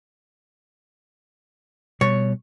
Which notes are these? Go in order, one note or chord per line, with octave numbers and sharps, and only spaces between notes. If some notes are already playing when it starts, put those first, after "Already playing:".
B2 G3 C#5